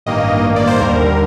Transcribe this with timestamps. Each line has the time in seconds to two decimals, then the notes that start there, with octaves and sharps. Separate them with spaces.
0.06 A1 G2 D#3 A#3 D#5
0.56 D5
0.67 C5
0.80 D#2 D3 G3 A#4